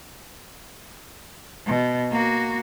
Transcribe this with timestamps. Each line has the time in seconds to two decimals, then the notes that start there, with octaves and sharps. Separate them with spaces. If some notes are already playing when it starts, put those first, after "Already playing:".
1.66 B2
2.11 A#3 F#4